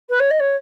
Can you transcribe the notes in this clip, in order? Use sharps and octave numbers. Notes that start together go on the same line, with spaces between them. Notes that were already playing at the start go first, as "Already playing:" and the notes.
B4
C#5
D#5
C#5